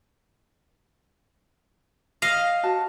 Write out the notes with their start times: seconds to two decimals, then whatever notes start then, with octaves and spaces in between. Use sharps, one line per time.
2.22 D#5 F5
2.63 F#4 A5